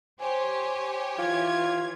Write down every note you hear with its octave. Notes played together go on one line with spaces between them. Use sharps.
G4 C5 C#5 G#5
E3 F4 G#6